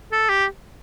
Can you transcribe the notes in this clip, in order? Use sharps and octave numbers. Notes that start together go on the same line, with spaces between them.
A4
G4